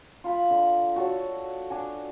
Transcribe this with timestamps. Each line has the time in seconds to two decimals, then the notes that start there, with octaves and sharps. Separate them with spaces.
0.24 F4 B5
0.50 D3
0.96 F#4 A4 C#5
1.70 D4 F#4 G#5